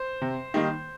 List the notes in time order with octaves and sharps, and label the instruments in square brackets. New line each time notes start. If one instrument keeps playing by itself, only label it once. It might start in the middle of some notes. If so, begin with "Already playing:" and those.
Already playing: [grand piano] C5
[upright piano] C3
D#3 G3 A#3 D#4